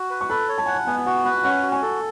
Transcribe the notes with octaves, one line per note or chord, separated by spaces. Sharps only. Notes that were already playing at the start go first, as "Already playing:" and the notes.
Already playing: F#4
B4
C#6
A4 B5
C#5
A5
F#5 G#5
A5
B3 G#5
F#4 F#5
B4 F#5
C#4 F#5
F#4
G#5
A4